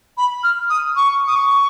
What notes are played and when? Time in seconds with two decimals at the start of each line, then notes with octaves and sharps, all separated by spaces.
0.18 B5
0.44 F6
0.70 D#6
0.96 C#6
1.27 D#6
1.36 C#6